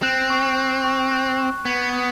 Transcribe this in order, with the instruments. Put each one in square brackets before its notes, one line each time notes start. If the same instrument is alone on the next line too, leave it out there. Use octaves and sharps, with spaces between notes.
[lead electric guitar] C4 [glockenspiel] F#6
[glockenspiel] C#6
F#6
C#6
F#6
C#6
[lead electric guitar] B3 [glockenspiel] G#6
[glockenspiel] D#6